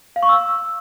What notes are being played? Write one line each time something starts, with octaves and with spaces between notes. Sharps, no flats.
F5
C#6
E6